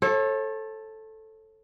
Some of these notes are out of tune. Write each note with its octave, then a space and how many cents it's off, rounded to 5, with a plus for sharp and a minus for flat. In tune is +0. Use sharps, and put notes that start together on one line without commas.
A4 +0 C#5 -40